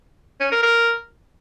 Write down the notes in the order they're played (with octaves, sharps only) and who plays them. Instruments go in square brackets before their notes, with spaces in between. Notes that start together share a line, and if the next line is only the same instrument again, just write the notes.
[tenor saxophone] C#4
A#4
A#4